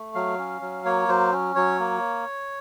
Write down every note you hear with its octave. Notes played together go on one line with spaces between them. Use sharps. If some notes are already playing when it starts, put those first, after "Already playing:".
Already playing: A3
F#3 F5
C#4
F#3
A#3 C#5
F#3 C5
C#4
F#3 C#5
A#3